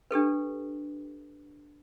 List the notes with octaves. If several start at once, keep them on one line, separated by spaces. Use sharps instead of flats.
D4 G4 A4 B4